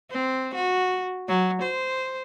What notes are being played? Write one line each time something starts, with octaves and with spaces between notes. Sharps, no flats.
C4
F#4
F#3
C5